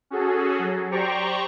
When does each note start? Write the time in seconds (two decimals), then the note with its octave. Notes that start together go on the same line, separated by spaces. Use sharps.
0.10 C#4 F#4 G#4 A4
0.59 F#3
0.91 G4 C5 D5 G5 A#5 C#6